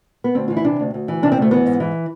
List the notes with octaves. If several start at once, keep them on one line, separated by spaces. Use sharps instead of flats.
B3
D2 C4
E3 F4
E4
C3 D4
D2
D2
E3
C3 D4
C4
D2 A3
E3 B3
G#2
E3